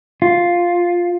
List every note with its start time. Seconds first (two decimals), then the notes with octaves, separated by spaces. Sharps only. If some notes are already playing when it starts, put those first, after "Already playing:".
0.22 F4